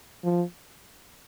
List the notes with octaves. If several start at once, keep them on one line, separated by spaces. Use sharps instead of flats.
F3